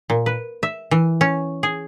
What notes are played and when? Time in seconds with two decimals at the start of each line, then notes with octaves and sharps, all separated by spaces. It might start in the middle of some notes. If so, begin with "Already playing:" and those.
0.10 A#2
0.26 B4
0.63 E5
0.91 E3
1.21 C#4
1.63 G#4